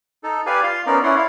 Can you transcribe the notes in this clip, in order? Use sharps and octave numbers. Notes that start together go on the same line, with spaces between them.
D#4 A4
G4 B4 D5 F5 G#5
F4 F5 C6
B3 C#4 D#4 A#4 D5
C#4 E4 C#5 D5 F#5 C6
E4 F5